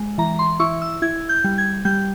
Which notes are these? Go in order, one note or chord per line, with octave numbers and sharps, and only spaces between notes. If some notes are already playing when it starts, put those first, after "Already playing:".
Already playing: G#3
E3 A#5
C6
E4 C#6
E6
E4 G#6
G6
G3
G#6
G3 G6